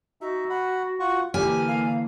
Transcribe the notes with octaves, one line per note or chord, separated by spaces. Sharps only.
D#4 F#4 E5
F#5 B5
F4 F#5 C#6
D3 E3 A#3 G4 G#5 F6
F5